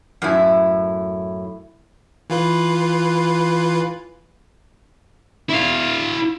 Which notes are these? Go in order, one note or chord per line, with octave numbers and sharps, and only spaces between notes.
F#2 A2 E4
E3 F4 B4
E4 F5